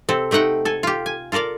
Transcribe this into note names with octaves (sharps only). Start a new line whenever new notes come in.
C3 C4 A4
C3 A3 D#4 F#5 G5
A4 G#5
F4 G4
G#5
F4 A4 A#4 D5 F5